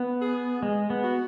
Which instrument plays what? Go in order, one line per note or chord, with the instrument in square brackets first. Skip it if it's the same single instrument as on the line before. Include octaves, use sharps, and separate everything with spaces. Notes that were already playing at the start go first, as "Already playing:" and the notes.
Already playing: [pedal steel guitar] B3
[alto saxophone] G#4
[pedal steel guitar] G#3
B3
[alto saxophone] F#4